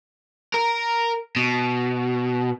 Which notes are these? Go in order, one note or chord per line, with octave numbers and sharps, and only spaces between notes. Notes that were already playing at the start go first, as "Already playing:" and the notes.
A#4
B2